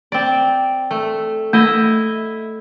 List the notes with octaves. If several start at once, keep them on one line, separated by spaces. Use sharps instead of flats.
C4 D5
A3
A3 E4 D#5 E5